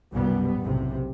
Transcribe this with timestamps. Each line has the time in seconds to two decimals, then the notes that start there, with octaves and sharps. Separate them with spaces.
0.13 C2 F#2 B2 G3 B3
0.59 F#1 B1 A2 C3